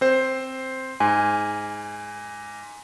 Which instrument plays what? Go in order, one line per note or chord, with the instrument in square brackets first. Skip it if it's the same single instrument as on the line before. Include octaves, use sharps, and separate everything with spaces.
[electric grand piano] C4 C5
[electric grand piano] G#2 [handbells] G#5